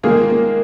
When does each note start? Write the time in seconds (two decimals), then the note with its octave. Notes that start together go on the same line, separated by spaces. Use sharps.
0.03 D#3 G#3 A#3 F4 G#4
0.30 A#3